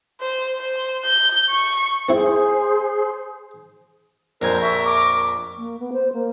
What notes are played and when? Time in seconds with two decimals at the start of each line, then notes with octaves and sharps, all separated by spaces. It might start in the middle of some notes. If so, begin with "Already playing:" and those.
0.21 C5
0.60 C5
1.05 G6
1.50 C#6
2.09 C4 E4 G#4 C5
4.42 A#1 F2 A#4 C5 G#5
4.61 E5 C#6
4.85 D6
5.58 A#3
5.80 B3
5.93 C5
6.13 A#3